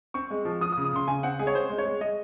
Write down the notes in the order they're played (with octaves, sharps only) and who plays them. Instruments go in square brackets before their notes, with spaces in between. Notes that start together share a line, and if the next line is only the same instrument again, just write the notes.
[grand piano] C4 C#6
G#3
F3
F3 D#6
D#6
C#3
D#6
C#3 C6
C#3 G#5
C4 F#5
G#3 G#4
C#5
C4 C5
G#3
C#5
G#3
G#3 D#5